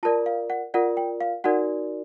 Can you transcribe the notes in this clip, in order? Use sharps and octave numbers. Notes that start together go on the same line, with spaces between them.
F4 A#4 D5 A5
F5
F#5
F4 A#4 D5 F#5
G5
F5
D#4 F#4 A#4 D5 F#5